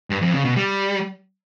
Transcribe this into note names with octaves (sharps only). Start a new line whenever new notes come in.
G2
F2
C#3
B2
G3